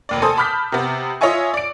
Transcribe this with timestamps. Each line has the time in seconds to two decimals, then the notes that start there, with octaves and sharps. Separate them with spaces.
0.09 F1 D#2 D5
0.22 A4 C5 G#5 D#6
0.37 A5 B5 D6 F6 G6 B6
0.72 C3 B3
1.21 F4 C#5 D#5 E5 G#5 C#6
1.54 D5 D7